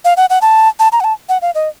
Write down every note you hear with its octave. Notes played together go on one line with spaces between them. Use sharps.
F5
F#5
F#5
A5
A5
A#5
F#5
A5
F#5
F5
D#5